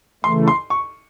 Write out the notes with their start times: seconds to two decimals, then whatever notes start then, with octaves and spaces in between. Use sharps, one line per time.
0.24 C#3 E3 A3 C6
0.48 C6
0.70 C#6